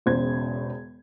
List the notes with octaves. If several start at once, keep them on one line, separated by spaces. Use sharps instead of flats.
E1 E2 C#3 C5 G#6